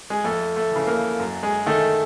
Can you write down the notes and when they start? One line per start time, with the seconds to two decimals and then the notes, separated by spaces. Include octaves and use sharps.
0.10 G#3
0.24 F2 A3
0.56 A3
0.72 C#3 E3
0.87 A#3
1.19 F#2
1.43 G#3
1.66 D#3 A3